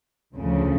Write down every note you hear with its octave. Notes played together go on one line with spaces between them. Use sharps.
D2 C#3 F3